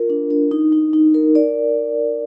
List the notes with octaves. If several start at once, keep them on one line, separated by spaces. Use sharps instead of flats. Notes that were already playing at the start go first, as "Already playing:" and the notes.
Already playing: F4 A#4
D4
D4
D#4
D#4
D#4
A#4
D5